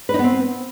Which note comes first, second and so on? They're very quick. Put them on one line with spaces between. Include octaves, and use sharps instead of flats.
B4 D#4 B3 C4